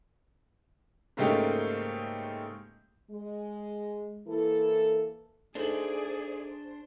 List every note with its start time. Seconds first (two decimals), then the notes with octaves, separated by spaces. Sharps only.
1.17 G#2 C#3 A3 A#3 D#4 G4
3.10 G#3
4.27 E3 A#3 E4 A4
5.55 A3 D4 D#4 G#4 C5 D5 F#7